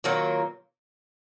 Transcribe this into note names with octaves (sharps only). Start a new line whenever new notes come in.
D#3 F#3 A#3 F4